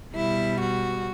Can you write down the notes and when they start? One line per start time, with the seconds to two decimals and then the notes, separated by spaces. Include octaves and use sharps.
0.15 B2 G3 E4
0.59 F#4